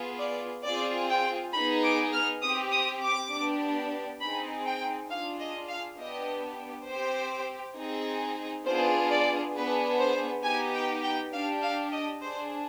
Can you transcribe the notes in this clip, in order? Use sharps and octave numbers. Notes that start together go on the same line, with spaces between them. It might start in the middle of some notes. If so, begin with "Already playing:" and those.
Already playing: B3 F4 G#4
D5
C4 F4 G#4 D5
G5
B3 D#4 G#4 B5
D6
F6
C4 G4 D#6
D#6
D6
B3 D4 G4
C4 D#4 G#4 B5
G5
D4 F4 G#4 F5
D#5
F5
B3 D4 G4 D#5
C4 G4 C5
C4 D#4 G#4
B3 D4 F4 G#4 C5
D5
B3 D4 G#4 B4
C5
B3 D#4 G4 G#5
G5
G5
D4 G4 F5
F5
D#5
D4 G#4 C5